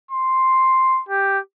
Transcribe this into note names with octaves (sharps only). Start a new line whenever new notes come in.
C6
G4